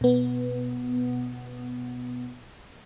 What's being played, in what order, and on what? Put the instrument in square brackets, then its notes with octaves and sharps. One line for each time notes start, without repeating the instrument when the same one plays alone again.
[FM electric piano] B2 B3